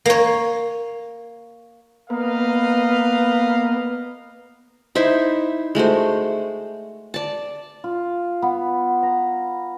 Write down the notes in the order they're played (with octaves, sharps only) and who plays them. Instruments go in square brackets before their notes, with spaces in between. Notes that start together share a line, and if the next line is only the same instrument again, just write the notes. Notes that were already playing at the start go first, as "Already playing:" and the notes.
[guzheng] A#3 C#5
[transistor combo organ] A#3 B3 [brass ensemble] B4 D#5 F5
[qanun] D#4 E4 C5 E5
G#3 A3 F#4 C5
D5 A5
[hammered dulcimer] F4
B3
A#5